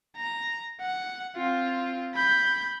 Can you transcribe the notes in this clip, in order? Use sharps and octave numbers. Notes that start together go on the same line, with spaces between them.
A#5
F#5
C4 F4
B5 G6